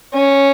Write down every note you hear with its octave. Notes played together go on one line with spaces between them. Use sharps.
C#4